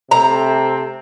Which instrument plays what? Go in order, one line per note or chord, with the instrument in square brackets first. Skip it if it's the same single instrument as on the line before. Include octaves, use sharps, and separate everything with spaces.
[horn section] C3 A3 C4 [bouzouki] A#5